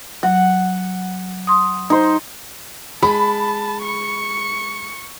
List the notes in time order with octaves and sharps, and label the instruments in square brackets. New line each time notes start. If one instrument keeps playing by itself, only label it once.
[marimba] F#3 [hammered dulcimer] F#5
[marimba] C6 D#6
[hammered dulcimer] D#4 C5
[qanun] G#3 [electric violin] A5 [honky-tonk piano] B5
[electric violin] C#6 C#7